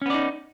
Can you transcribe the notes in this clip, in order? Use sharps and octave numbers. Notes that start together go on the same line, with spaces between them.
B3 C#4 D#4 D5